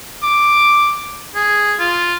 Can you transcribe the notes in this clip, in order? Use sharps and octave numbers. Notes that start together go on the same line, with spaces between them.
D6
G#4
F4